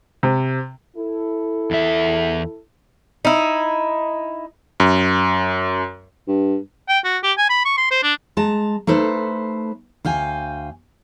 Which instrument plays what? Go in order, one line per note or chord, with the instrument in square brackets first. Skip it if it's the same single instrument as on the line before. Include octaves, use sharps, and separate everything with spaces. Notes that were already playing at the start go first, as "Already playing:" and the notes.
[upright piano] C3
[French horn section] E4 A4
[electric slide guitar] E2 E5
[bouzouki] D#4 E4
[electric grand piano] F#2
[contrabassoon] G2
[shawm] G5
F#4
G4
G#5
B5
C#6
C6
C5
D4
[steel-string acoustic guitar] G#3 A5 A#5
A3 D#4 A4 B4 C5
D2 F5 G5 G#5